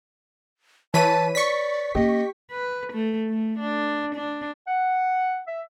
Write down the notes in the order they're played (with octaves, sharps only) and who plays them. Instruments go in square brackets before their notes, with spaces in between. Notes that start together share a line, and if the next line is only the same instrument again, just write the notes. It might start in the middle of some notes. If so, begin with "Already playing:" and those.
[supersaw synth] E3 B6 D#7 [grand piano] B4 C#5 B5 [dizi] A5
[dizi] D5 [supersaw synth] C#6 B6
[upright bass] A#3 C#4 [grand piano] G4 [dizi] D#5
[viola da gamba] B4
A3
A3
D4
D4
[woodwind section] F#5
E5